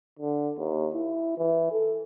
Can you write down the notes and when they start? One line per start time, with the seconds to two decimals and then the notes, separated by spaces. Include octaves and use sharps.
0.19 D3
0.58 D#2
0.94 E4
1.38 E3
1.72 A4